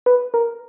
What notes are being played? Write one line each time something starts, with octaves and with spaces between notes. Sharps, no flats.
B4
A#4